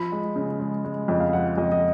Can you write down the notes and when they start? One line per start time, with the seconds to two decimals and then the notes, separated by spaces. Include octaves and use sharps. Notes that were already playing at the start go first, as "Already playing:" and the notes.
Already playing: F3 B5
0.12 G#3
0.36 C#3
0.60 G#3
0.85 G#3
1.08 F2 D#5
1.20 F5
1.33 F3 F#5
1.58 F2 D#5
1.72 D#5